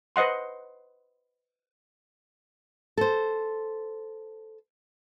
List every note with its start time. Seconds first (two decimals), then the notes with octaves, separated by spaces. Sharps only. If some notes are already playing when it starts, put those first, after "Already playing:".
0.16 B4 C5 D#5 F#5 C6
2.97 A4 C5